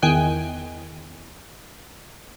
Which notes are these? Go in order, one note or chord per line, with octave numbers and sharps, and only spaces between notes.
E2 D#3 G5 G#5 F#6